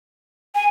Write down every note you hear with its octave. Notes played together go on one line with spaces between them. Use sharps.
G#5